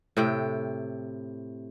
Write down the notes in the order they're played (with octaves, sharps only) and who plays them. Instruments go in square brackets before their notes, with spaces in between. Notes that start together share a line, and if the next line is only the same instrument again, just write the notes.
[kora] A2 C3 G5